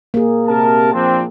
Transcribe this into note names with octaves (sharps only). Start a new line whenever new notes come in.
A#3 G#4
C3 A#4 A5
F3 C4 D4